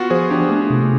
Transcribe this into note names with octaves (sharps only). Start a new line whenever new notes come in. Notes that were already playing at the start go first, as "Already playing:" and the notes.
Already playing: B3 F4 F#4
F3 G#4
D4 G4
A3
C3